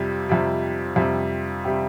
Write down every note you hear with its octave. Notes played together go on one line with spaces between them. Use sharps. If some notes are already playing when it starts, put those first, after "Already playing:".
Already playing: F2 C3 G3
F2 C3 G3
F2 C3 G3
C3 G3 G4